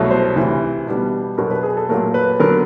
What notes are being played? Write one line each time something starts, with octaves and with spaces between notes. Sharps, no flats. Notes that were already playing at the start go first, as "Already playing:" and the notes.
Already playing: C2 B2 F#3 A3
C5
D2 C3 E3
B2 G3 B3 D4
B2 F#3 B3 D4 A#4
B4
G#4
A4
A#2 F#3 A3 A#4
B4
D3 F#3 B3 A#4